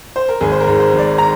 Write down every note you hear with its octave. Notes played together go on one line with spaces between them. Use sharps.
C5
A#4
G#1 G#4
C5
A#4
G#2
C5
G#1
D5
A#5